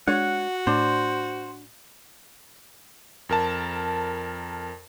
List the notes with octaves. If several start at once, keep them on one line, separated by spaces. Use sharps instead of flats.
G#3 D4 F#4 C#5 F#5
A2 D4 C5
F2 A#4 A5